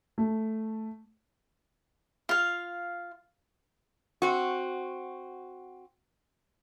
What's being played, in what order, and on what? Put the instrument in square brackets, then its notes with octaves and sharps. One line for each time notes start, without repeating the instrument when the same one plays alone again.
[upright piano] A3
[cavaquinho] F4 F5
[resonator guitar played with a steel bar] C4 F#4